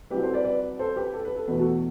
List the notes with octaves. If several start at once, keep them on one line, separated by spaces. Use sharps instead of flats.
C2 C3 F#3 G4 B4
A4 C5
B4 D5
B4 D5
A4 C5
G4 B4
A4
B4
A4
E2 B2 A3 B4
F#4 A4